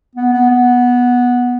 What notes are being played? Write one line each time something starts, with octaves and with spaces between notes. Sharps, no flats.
B3
B3
B3